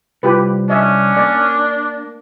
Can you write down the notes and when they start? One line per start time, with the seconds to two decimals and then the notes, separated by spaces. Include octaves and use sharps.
0.23 C2 F4 G4 B4
0.70 C#4 D4 D#5 E5
1.17 A#3 D5